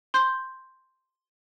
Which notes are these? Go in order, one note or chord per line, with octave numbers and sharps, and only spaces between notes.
C6 G6